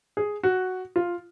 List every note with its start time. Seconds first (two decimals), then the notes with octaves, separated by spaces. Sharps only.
0.17 G#4
0.43 F#4
0.96 F4